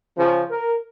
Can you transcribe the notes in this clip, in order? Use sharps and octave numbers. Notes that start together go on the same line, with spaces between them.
C#3 F3
A#4